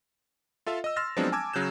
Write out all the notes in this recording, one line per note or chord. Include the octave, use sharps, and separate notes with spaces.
F4 A4 E5 F5
D#5 E6
C6 E6 F6 A6 A#6
F3 F#3 G#3 B3 C4 D4
G#5 A5 D6 E6 G#6
C#3 F#3 F#6 G6 E7